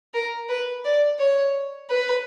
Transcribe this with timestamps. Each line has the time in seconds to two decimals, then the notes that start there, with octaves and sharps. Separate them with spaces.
0.14 A#4
0.49 B4
0.85 D5
1.19 C#5
1.89 B4